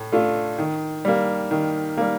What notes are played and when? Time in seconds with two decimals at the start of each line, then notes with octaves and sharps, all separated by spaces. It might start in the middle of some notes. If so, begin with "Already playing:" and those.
Already playing: A2
0.12 A3 D4 F4
0.58 D#3
1.05 G3 A#3
1.51 D#3
1.97 G3 A#3